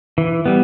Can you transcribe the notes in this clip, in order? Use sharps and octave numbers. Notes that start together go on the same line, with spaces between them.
E3
G3 B3